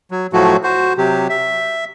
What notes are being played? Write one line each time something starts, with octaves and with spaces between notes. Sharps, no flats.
F#3
A2 F3 F#3 A3 F#4
F#4 C5
C3 F#3 G4
E5